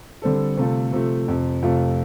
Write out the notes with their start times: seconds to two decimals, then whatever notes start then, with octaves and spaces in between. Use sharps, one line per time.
0.22 D3 G3 C4 A4
0.58 C3 A3 F4 A4
0.92 C3 F3 A3
1.28 F2 C3 F3
1.62 F2 C3 A3 F4